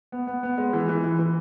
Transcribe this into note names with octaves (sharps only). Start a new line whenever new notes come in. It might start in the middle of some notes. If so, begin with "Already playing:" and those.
B3
B3
B3
G#3
E3
E3
E3
E3